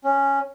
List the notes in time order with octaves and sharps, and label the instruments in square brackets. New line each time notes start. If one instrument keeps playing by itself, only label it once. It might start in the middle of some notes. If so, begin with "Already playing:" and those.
[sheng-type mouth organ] C#4